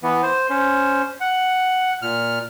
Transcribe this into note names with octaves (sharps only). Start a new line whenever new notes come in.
E3 B3
C5
C#4 C5
F#5
A#2 F6